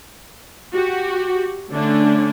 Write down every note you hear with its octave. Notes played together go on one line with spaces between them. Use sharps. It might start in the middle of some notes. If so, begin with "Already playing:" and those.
F#4 G4
D3 A3 C#4 D4